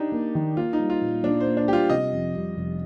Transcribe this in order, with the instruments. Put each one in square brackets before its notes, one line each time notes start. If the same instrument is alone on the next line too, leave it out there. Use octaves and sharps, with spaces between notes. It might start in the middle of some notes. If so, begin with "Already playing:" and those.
Already playing: [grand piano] D4 D#4 G4
[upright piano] A#3
D#3
[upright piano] A#3 [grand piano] F4
[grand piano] D#4
[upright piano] G3
[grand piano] F4
[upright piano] A#2
[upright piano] A#2 [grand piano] D4
[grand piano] C5
[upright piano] A#3
[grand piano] D4
[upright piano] G3 [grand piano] F4 G4
[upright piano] C3 [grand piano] D#5
[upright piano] F2
G3
F1